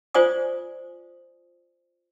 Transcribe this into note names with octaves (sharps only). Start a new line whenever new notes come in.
F4 C5 D5 G#5 D#6